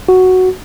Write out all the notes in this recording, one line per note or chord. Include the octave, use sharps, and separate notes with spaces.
F#4